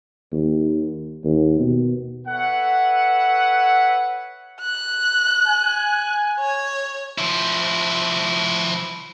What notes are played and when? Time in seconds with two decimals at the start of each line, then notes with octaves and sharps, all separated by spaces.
0.33 D#2
1.24 D#2
1.60 B2
2.28 A4 B4 C#5 E5 F#5
4.61 F#6
5.47 G#5
6.40 C#5
7.18 F3 E4